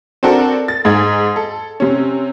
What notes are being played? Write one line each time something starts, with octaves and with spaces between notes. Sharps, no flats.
C4 D4 F#4 A4 A#4
A6
G#2 G#4 G#6
A4
C3 C#4